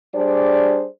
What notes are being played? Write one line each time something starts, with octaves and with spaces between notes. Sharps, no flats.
G3 D4 G#4 C5 D5